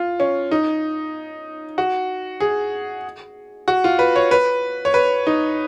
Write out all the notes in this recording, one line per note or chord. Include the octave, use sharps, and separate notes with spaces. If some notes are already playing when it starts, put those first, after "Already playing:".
Already playing: F4
C#4
D#4
F#4
G#4
F#4
F4
B4
C#5
B4
C#5
B4
D#4